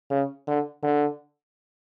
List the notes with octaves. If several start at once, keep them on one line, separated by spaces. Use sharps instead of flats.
C#3
D3
D3